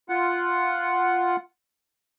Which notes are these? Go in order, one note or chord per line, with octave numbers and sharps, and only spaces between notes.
F4 F#5